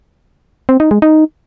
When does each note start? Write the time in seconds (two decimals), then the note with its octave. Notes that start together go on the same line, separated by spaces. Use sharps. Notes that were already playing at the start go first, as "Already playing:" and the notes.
0.69 C4
0.80 D#4
0.91 G#3
1.02 D#4